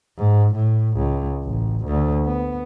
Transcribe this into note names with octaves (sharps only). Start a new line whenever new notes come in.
G#2
A2
C#2
A1
D2
B3